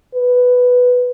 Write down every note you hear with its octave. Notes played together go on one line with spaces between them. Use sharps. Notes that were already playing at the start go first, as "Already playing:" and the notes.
B4